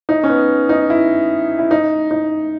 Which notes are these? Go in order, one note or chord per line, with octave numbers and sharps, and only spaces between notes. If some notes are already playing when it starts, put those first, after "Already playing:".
D#4
C#4
B3
D#4
E4
E4
D#4
D#4